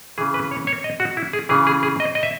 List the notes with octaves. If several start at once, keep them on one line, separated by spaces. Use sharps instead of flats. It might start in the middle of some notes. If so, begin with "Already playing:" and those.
C#3 E3 G#4
B4
C#5
C#5
D#5
F#4
E4
G#4
C#3 E3 G#4
G#4
G#4
D#5
D#5
E5